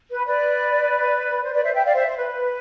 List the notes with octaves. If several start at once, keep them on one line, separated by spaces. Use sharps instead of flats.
B4
B4 D5
C5
B4 D5
C5 E5
E5 G5
D5 F5
C5 E5
C5
B4